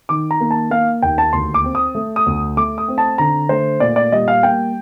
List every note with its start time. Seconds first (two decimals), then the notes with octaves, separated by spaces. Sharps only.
0.09 D#3 D6
0.31 A#5
0.41 A#3
0.51 A5
0.71 A#3 F5
1.02 D#2 G5
1.18 A5
1.33 D2 C6
1.54 D6
1.64 C4
1.75 D#6
1.95 A3
2.16 D#6
2.26 D2
2.57 A3 D6
2.78 D#6
2.88 C4
2.98 A5
3.18 D3 A#5
3.49 A3 C5
3.80 A#2 D5
3.96 D5
4.12 G3 D#5
4.28 F5
4.43 A#3 G5